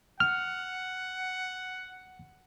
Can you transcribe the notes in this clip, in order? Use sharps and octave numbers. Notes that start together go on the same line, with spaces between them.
F#5 F6